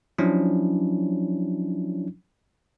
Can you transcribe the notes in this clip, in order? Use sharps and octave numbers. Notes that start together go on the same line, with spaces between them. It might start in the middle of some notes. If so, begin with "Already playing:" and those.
F3 F#3 C#4 D4 E4